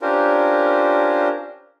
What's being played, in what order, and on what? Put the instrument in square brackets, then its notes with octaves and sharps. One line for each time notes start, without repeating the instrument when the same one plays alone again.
[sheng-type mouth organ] C#4 D4 F4 G4 A#4 C5